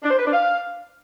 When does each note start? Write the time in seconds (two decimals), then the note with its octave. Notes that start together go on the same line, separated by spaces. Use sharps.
0.03 D4
0.10 C5
0.18 B4
0.25 D4
0.33 F5